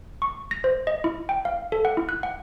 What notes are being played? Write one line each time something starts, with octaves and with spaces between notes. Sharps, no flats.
C#6
A#6
C5
D#5
E4
G5
F5
A4
F#5
E4
F#6
F#5